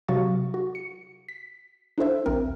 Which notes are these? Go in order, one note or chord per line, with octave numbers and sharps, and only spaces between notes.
C3 F#3 F#4 F5 C#6 A6
F#4
C#7
B6
D4 E4 A4 C5 E5
A#1 D#2 C4 A#4 A#5